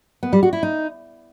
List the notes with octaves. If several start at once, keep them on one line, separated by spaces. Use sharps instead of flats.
B3
G3
F#4
E4
D#4